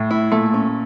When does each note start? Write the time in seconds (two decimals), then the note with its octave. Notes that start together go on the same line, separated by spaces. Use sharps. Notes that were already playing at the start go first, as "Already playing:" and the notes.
Already playing: A2
0.11 E4
0.32 A#2 A3
0.54 C#4